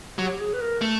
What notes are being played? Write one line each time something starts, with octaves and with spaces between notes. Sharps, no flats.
F#3 G4
G#4
B4
A#4
A3